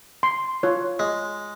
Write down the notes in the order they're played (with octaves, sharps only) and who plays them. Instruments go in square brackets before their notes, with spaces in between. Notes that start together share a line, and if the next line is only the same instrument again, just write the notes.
[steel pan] C6
F4 C#5
[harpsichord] G#3